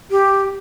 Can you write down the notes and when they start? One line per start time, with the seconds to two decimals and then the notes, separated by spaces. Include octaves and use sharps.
0.11 G4